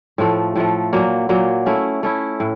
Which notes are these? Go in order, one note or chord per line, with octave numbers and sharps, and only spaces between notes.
A2 F3 A3
A2 F3 A3
A#2 F#3 A#3
A#2 F#3 A#3
A3 C#4 E4
A3 C#4 E4
A2